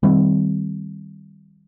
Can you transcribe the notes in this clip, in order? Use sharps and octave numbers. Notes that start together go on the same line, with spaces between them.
D#3 G3 C4